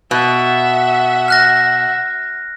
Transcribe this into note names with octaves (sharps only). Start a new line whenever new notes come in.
B2 E5 F#5
F6 F#6 A#6